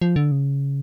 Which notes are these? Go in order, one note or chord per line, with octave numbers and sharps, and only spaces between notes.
F3
D3
C#3